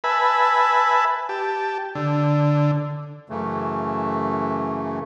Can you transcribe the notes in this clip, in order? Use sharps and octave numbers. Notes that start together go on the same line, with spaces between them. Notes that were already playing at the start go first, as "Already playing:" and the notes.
B4 E5 G#5 A5 B5
G4 A5
D3
F#2 C#3 E3 A3